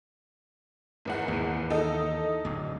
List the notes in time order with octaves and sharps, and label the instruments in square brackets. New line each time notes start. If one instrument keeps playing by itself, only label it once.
[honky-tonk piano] G#1 E2 F#5
[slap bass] D#2 E3
[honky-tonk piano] D#4 A4 D#5
[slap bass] D1 D2